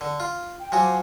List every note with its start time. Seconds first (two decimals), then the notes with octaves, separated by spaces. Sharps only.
0.01 D3
0.20 F4
0.60 G5
0.72 F3 F#3 F#4 C5 G#5 D6